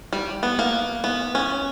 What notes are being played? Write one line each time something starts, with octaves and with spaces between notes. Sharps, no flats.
G3
B3
A#3
B3
C#4